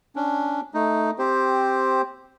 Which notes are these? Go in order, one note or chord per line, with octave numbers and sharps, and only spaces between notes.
C#4 D4
A3 D#4
C4 G4 C5